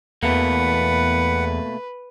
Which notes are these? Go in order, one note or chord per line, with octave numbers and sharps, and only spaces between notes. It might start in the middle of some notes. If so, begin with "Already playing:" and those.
E2 B2 A3 A#3 B4 F#5